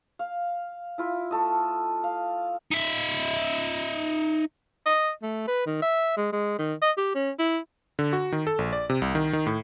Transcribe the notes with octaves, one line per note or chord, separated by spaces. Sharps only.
F5
E4 F4 E5
A3 A4 D#5
F5
D#4 E5
D#5
A3
B4
D#3
E5
G#3
G#3
D#3
D#5
G4
C#4
E4
D3
F#4
D#3
A4
A#1
D5
C3
C2
D#3
D#3
A2